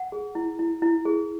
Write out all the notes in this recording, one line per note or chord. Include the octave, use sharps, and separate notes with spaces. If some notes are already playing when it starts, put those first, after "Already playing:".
Already playing: F#5
G#4
E4
E4
E4
G#4